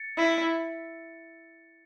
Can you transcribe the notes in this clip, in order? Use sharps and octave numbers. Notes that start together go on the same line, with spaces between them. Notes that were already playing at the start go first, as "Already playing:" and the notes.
Already playing: A6 C#7
E4